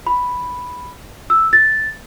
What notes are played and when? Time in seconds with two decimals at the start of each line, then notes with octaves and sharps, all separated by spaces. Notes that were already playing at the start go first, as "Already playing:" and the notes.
0.07 B5
1.30 E6
1.53 A6